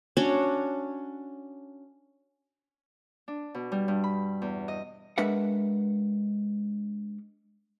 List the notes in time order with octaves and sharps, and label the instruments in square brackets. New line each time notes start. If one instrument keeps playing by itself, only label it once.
[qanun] C#4 D4 F#4 C#5
[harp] D4
B2
G3
G2
B5
E2
D#5
[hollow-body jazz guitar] G#3 D4 A#4 B4 E5 F#5